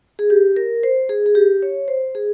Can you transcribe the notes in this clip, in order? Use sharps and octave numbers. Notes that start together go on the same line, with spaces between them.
G#4
G4
A#4
C5
G#4
G#4
G4
C#5
C5
G#4